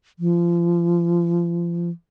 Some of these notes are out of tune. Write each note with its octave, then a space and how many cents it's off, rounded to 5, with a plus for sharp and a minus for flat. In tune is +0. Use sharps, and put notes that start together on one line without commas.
F3 -30